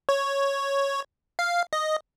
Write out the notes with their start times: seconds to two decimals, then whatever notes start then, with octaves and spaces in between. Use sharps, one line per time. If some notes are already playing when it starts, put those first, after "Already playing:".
0.09 C#5
1.39 F5
1.73 D#5